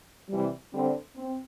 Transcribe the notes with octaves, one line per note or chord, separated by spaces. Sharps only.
C3 E3 G3
D3 G3 C4
C4